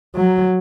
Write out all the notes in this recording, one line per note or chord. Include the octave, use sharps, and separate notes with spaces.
F#3